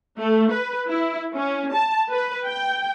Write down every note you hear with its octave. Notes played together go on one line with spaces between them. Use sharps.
A3
B4
E4
C#4
A5
B4
G5